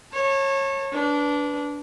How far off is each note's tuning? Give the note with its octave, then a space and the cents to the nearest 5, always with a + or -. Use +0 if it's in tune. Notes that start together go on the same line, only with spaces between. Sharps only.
C#5 -25 A5 +25
D4 -20 B4 +0